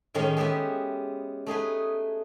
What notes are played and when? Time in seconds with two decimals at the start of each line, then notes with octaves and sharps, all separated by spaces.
0.14 A2 D#3 G#3 C#4 A#4
0.37 G#3 B3 G4 E5
1.46 A3 D#4 G#4 B4